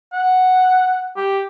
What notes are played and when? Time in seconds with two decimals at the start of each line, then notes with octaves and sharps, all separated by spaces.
0.13 F#5
1.16 G4